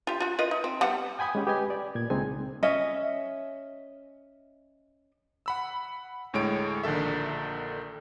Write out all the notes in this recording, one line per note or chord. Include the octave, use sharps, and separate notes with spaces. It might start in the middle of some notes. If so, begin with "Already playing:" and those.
F4 G4
F4 F#4
F4 B4 D#5
D#4
C4
G3 B3 F#5
G5 G#5 B5 D#6 G#6
G#3 C#4 G4
G4 B4 D#5 G#5
D5
A#2 G#6
C#2 G#3 C4 D#4 G#5
C#4 D#5 E5
F#5 B5 E6
D2 A2 G#3 C#5 D7
A#1 D3 D#3 A4 E5